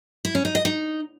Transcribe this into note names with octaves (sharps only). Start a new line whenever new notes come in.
E4
C#4
D#4
D#5
D#4